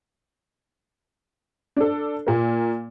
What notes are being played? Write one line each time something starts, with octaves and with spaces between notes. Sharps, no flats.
D4 A4
A#2 A#3